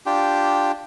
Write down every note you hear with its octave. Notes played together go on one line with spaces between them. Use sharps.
D4 F4 G4 G5